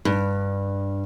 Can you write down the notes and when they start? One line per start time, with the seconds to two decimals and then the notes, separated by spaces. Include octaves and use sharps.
0.05 G2